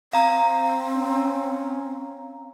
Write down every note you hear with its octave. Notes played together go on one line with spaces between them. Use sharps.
C4 F5 A#5
C#4